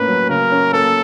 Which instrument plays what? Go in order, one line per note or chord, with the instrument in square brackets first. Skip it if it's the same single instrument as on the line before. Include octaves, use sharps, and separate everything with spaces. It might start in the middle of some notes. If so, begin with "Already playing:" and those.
Already playing: [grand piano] A2 A#3 C#4 [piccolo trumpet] B4
[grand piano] F#3
[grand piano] C#3 [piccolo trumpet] A#4
[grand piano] C#4
[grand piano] A#3 [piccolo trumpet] A4